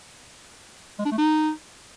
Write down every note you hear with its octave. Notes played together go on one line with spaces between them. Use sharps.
G#3
D4
A3
D#4